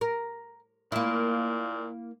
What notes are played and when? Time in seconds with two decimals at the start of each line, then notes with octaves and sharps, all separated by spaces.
0.01 A#4
0.92 A#2 A#3 E4